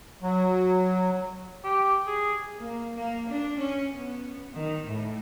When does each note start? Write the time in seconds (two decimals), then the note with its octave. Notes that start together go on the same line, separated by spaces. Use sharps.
0.22 F#3
1.64 G4
2.07 G#4
2.60 A#3
2.97 A#3
3.29 D4
3.59 C#4
3.93 B3
4.55 D#3
4.87 A2